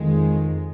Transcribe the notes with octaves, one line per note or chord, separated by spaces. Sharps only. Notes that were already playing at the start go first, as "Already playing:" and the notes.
Already playing: F2 D#3 G#3